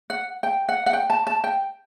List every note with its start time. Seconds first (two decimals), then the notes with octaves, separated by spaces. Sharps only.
0.10 F#5
0.43 G5
0.69 F#5
0.86 F#5
0.93 G5
1.10 A5
1.27 A5
1.44 G5